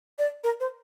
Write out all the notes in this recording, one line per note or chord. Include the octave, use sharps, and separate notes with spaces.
D5
A#4
C5